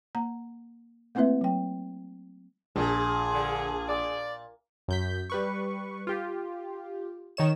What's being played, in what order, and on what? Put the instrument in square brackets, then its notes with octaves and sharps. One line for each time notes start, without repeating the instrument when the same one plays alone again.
[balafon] A#3 A#5
A3 A#3 C4 E4 B4 E5
F#3 G5
[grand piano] A#1 [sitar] A#2 [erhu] G#4
[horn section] D3
D5
[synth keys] F#2 G6 B6
G3 B4 C#6
F4 G4
D#3 C#5 E7